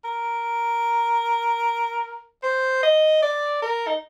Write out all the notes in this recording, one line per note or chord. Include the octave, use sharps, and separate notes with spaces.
A#4
C5
D#5
D5
A#4
D#4